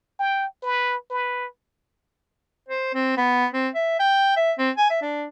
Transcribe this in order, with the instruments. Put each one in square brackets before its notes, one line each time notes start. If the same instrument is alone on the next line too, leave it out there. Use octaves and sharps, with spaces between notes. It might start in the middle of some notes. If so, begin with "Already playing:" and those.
[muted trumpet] G5
B4
B4
[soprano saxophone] C5
C4
B3
C4
E5
G5
E5
C4
G#5
E5
D4